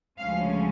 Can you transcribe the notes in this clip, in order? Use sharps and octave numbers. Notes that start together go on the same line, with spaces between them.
D2 C#3 F3 G#3 C#4 F5